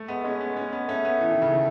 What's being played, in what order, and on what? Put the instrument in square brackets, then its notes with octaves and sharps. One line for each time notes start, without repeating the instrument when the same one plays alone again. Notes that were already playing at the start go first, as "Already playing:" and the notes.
Already playing: [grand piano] A3
[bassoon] G#3 [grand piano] B3
[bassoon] G#3 [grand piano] C#4
[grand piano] B3
C#4
B3
[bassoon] A3 [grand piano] C#4
[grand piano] B3
E3
D#3
C#3
D#3